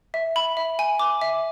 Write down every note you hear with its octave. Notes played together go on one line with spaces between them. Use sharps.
E5
B5
E5
G#5
D6
E5